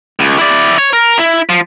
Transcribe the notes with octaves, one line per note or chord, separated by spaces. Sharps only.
C#2
E4 D5
C#5
A#4
E4
F3